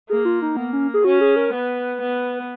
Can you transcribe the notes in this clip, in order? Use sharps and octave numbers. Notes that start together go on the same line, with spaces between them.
A#3 G#4
F4
D#4
A#3 B3
C#4
G#4
C#4 F#4
G#4
A#4
B3 B4
B3